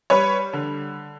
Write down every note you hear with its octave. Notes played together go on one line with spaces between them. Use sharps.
G3 B4 C#5
D3